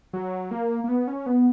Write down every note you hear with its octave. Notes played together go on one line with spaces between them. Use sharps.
F#3
A#3
A#3
B3
C#4
B3